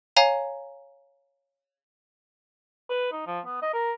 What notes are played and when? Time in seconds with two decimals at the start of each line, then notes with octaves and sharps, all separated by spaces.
0.17 C#5 F5 G#5 A#5
2.90 B4
3.12 D#4
3.27 F3
3.46 B3
3.62 D#5
3.74 A#4